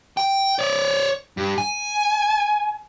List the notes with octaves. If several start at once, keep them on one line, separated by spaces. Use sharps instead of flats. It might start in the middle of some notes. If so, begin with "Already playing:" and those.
G5
C#5 D5
G2
G#5